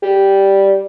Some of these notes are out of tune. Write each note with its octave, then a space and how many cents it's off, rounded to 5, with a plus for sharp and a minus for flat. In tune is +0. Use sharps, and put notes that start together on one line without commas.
G3 -5